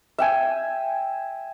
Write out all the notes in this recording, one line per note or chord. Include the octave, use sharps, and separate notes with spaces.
E5 G5 G#5